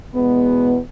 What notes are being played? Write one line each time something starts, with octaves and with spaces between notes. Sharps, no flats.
E2 B2 G#3 B3